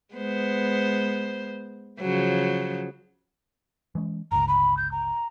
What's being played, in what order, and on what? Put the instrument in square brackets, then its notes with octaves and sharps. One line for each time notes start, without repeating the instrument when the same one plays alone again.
[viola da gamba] G#3 B3 C5
C#3 F3 F#3
[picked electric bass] E3 G#3 C#4
[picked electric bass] G1 C#2 [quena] A#5
[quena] B5
G6
A#5